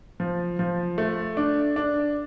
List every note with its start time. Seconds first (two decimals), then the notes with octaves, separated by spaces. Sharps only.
0.20 F3
0.59 F3
0.98 A3
1.37 D4
1.76 D4